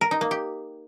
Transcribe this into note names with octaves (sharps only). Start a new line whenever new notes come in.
A#4
D#4
A#3
G4